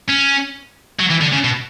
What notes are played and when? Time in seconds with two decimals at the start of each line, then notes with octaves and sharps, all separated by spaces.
0.09 C#4
1.00 F#3
1.11 E3
1.22 D3
1.33 C#3
1.44 B2